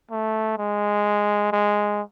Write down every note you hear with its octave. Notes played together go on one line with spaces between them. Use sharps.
A3
G#3
G#3